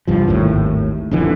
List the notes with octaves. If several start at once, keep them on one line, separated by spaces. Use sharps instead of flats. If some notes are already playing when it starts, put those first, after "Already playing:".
C2 G2 F3
G#1 D#2 A2
D#1 F2 D3 E3